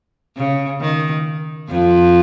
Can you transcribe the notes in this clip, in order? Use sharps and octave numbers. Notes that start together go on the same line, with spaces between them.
C#3
D#3
F2 F3